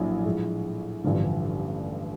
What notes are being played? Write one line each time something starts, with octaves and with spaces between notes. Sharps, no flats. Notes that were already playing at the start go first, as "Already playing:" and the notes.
Already playing: A#1 A2 F#3
A2 F3 G#3
A1 G2 D3 F3